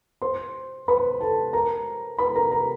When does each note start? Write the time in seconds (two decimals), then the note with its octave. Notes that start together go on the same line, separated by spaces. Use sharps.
0.22 C5 C6
0.88 B4 B5
1.21 A4 A5
1.53 A#4 A#5
2.18 B4 B5
2.35 A#4 A#5
2.51 A#4 A#5